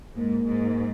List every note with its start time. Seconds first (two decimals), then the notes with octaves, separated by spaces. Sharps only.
0.17 G#2 A#3
0.46 G#2